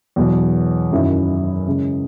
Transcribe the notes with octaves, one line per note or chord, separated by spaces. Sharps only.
E2 B2 F#3
F#2 D#3 F#3 C#4 E4
C#3 G#3 C#4